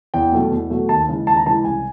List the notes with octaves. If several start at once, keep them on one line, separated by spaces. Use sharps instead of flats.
E2 G5
B2 F#3 A3
E2
B2 F#3 A3
D#2 A5
C#3 E3 G#3
D#2 A5
A#5
C#3 E3 G#3 A5
C2 G#5